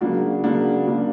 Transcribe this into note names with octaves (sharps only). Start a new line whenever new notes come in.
C#3 F#3 A#3 D4 F#4
C#3 F#3 A#3 D4 F#4
C#3 F#3 A#3 D4 F#4